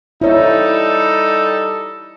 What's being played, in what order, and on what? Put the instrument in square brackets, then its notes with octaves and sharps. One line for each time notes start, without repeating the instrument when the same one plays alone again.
[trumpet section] G3 D#4 A4 [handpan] E4 C#5